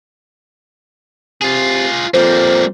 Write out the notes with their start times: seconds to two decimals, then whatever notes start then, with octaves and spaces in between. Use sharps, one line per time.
1.42 C3 F4 G#4
2.14 F2 G3 A#3 C5